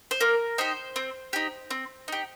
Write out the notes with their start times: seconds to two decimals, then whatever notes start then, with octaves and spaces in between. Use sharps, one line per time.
0.11 C5
0.20 A#3 A#4
0.58 D#4 G4 C5
0.96 C4
1.33 D#4 G4
1.71 C4
2.08 D#4 G4